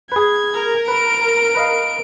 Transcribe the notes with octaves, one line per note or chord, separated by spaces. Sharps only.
G#4 B4 G#6
A#4
B4 D7
B4 D#5 F5